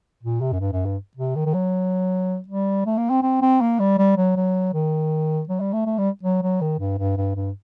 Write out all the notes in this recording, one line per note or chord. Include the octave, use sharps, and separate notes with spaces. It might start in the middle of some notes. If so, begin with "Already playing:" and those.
A#2
C3
F#2
G2
F#2
G2
C3
D#3
D#3
F#3
G3
A3
A#3
C4
C4
C4
A#3
G3
G3
F#3
F#3
D#3
F#3
G3
A3
A3
G3
F#3
F#3
D#3
G2
G2
G2
G2